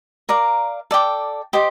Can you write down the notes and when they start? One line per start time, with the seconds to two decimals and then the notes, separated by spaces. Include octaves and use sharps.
0.29 A#4 D5 F5 A#5
0.91 A4 D5 G5 D6
1.53 G4 C5 D#5 G5